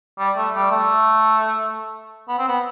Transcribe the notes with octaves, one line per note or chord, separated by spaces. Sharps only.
G3
A3
G3
A3
B3
C4
B3